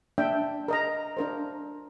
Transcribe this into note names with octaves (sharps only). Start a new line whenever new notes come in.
A#3 D4 E5 G5
A#4 D#5 A#5
D4 A#4 C5